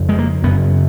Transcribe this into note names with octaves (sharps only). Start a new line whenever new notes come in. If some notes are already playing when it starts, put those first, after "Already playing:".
Already playing: F2 C#3
G#3
A#3
F#2 C#3 B3